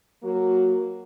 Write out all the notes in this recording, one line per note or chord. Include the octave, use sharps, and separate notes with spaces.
F#3 A#3 F#4